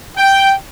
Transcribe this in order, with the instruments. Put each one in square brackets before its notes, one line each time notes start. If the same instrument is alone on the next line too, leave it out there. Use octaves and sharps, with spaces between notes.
[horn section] G5